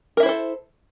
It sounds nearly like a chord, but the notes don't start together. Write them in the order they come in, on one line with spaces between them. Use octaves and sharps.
A#4 E5 E4 C5 A4